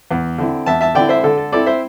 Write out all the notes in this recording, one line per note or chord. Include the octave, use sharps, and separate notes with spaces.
E2
D3 C4 E4
E2 E5 A5
E5 A5
D3 C4 E4 D5 G5
C5 E5
D3 A4
A4
C4 E4 A4 D5
C5 E5